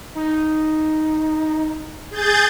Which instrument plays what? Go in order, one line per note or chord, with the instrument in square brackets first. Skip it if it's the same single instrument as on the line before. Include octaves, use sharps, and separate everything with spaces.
[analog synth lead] D#4
[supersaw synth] G#4 G6 A6